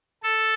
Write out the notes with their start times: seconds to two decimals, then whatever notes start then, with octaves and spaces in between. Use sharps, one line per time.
0.23 A4